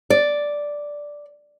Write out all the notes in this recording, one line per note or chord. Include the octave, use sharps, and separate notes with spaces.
D5